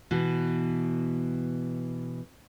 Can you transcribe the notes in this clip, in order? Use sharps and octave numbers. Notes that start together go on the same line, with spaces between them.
B2 E3